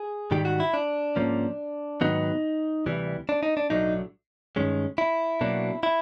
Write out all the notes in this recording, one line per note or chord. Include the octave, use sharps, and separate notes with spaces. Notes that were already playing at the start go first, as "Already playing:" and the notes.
Already playing: G#4
G#2 D#3 G3 G4
F#4
E4
D4
G#2 F3 A#3 C#4
G#2 D#3 F#3 B3 D#4
D2 C3 E3 G3
D4
D#4
D4
B1 A2 F#3 A3 D4 D#4
G2 D#3 G#3 C#4
E4
B2 F#3 A#3 D4
E4